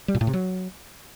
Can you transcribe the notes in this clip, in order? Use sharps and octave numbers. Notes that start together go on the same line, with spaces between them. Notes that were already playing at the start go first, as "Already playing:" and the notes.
G3
A#2
A2
C3
F#3